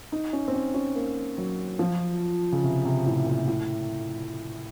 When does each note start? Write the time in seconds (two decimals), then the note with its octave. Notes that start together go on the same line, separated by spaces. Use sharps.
0.12 D#4
0.33 C#4
0.48 C4
0.54 C#4
0.74 C#4
0.95 A#3
1.38 F#3
1.79 F3
2.52 C#3
2.64 C3
2.85 C3
3.06 A2
3.27 A#2
3.48 A2